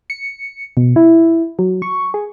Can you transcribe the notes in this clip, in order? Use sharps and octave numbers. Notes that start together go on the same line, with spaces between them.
C#7
B2
E4
F#3
C#6
G#4